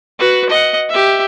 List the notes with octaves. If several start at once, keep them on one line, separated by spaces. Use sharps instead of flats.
F#4 B4
D#5 F#5
G4 E5